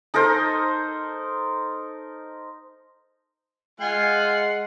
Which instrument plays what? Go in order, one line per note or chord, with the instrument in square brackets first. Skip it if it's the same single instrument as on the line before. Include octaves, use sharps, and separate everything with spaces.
[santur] D#4 A4 A#4 C5
[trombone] G#3 [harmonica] F4 G#5 [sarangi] F#5 [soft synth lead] C7